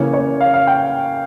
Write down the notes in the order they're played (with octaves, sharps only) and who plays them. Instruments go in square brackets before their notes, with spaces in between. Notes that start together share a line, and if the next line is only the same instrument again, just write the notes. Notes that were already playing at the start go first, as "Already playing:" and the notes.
Already playing: [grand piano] C#3 E3 A#3 C#5
C#5
F5
F5
G5